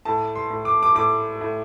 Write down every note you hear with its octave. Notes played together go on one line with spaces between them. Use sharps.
A2 A5
C6
A2
D6
D6
A2 D6
A2